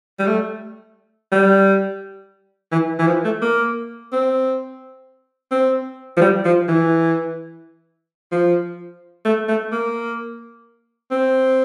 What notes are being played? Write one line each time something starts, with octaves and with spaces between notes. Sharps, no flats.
G3
A3
G3
E3
E3
F3
A3
A#3
C4
C4
F3
G3
F3
E3
F3
A3
A3
A#3
C4